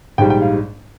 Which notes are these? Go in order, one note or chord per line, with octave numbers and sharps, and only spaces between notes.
A#1 G#2 G3 G5
G5
F5